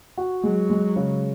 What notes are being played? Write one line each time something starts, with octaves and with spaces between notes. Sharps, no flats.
F#4
F#3 G#3
G#3
C#3